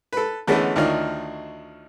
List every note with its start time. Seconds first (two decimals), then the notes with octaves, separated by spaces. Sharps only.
0.13 A4 B4
0.47 D3 E3 G#3 A3 B3 C#4
0.76 D2 D#3 D4 D#4 F4 C#5